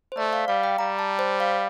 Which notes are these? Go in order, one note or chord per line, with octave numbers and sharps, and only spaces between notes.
C5
A3 D5
F5
G3 F5
G5
G3 A#5
A5
C5
F5